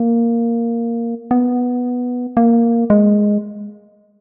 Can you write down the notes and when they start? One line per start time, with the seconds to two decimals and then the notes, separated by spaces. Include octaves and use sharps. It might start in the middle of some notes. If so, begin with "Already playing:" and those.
Already playing: A#3
1.31 B3
2.37 A#3
2.90 G#3